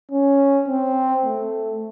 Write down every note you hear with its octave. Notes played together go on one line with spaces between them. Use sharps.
C#4
C4
A3